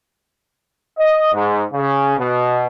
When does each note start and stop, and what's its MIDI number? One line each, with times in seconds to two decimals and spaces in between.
0.98 1.31 75
1.33 1.63 44
1.73 2.16 49
2.17 2.66 47